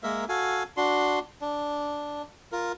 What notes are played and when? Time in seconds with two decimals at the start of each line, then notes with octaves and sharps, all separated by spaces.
0.03 G#3 A#3 A#4 E5
0.29 F#4 A4 F5 G#5
0.77 D4 F#4 C6
1.41 D4
2.52 F4 A#4